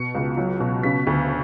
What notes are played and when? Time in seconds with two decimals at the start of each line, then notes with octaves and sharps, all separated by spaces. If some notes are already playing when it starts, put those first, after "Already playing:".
Already playing: B2 C#7
0.15 C#2
0.37 F#3
0.60 B2
0.83 C#3 B6
1.07 D2